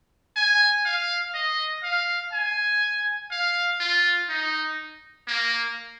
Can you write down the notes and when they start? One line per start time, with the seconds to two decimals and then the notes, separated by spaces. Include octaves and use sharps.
0.36 G#5
0.85 F5
1.34 D#5
1.83 F5
2.32 G#5
3.31 F5
3.80 F4
4.29 D#4
5.28 A#3